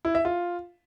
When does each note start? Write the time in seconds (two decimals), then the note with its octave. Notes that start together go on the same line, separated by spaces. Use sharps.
0.05 E4
0.15 E5
0.25 F4